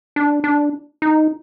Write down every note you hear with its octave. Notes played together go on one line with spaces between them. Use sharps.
D4
D4
D#4